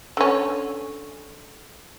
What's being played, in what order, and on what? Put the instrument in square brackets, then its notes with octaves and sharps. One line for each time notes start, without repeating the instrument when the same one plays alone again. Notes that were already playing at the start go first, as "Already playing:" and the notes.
[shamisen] D3 C#4